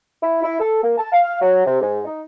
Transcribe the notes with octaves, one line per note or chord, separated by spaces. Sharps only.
E4
E4
A4
A#3
A5
F5
F#3
C3
G#2
D#4